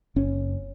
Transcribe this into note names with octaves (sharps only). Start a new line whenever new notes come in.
F#1 C#4